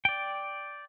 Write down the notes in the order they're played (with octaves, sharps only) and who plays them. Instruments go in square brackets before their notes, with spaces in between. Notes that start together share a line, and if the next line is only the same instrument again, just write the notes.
[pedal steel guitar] D5 G5